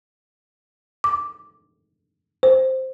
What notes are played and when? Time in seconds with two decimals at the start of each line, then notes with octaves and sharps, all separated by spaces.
1.04 D6
2.43 C5